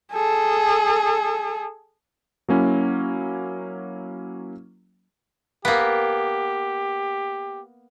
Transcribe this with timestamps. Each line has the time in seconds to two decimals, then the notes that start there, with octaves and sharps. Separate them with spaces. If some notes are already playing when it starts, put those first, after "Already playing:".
0.13 G#4 A4
2.49 F#3 A#3 C#4 E4
5.65 A#3 B3 G4